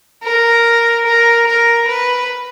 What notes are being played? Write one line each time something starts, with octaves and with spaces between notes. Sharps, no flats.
A#4
A#4
A#4
B4